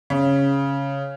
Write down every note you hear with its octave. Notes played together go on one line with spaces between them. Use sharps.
C#3